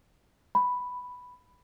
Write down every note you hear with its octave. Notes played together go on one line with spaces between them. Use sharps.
B5